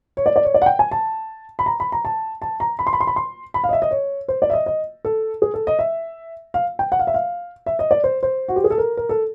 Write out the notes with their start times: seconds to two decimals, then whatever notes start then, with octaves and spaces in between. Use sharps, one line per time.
0.17 C#5
0.26 D5
0.36 D5
0.45 C#5
0.54 D5
0.62 F#5
0.66 G5
0.79 G#5
0.91 A5
1.59 B5
1.66 A#5
1.80 B5
1.92 A#5
2.05 A5
2.42 A5
2.60 A#5
2.79 B5
2.87 C6
2.93 B5
3.01 C6
3.07 B5
3.16 C6
3.54 B5
3.64 F5
3.69 D#5
3.73 E5
3.82 D#5
3.91 C#5
4.28 C5
4.42 D5
4.50 E5
4.53 D#5
4.66 D#5
5.05 A4
5.42 G#4
5.54 A4
5.67 D#5
5.79 E5
6.54 F5
6.79 G5
6.92 F#5
6.99 F5
7.07 E5
7.14 F5
7.66 E5
7.79 D#5
7.91 D5
8.04 C5
8.23 C5
8.48 F#4
8.56 G4
8.64 G#4
8.71 A4
8.78 A#4
8.97 A#4
9.09 A4